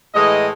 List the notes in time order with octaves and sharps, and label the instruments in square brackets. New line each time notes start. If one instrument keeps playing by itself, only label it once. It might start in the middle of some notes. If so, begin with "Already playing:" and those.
[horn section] A2 E3 G#3 D#5